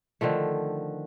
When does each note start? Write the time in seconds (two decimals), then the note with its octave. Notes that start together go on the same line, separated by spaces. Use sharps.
0.21 D3 D#3 F3 A3